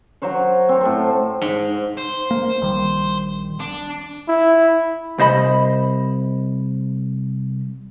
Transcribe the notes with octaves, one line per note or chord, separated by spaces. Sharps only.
F#3 F#4 C5 C#5
C4 C#5
A2 A4 C5
G#2
C5
A#3
A#1 D#3 G3
D4
E4
C2 C5 D#5 B5